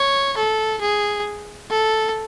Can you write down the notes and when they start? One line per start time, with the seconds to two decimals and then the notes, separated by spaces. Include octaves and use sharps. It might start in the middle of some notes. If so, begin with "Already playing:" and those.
Already playing: C#5
0.37 A4
0.82 G#4
1.70 A4